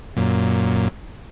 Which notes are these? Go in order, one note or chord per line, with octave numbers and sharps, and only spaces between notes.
F#2 A#2